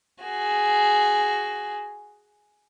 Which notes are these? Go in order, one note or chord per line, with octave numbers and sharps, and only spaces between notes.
F#4 G#4